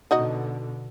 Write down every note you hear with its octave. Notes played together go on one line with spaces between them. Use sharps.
B2 D3 D#4 F#4 D#5